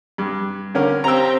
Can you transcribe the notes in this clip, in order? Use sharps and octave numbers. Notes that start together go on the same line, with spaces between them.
G2
D3 C#4 A#4
C4 G4 A#5 E6